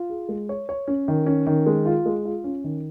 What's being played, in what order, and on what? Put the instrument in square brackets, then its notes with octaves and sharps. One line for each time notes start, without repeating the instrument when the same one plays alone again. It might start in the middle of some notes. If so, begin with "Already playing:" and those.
Already playing: [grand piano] F4
G#4
G#3
C#5
C#5
C#4
D#3
C#4
D#3
G#3
F4
G#3
F4
C#4
D#3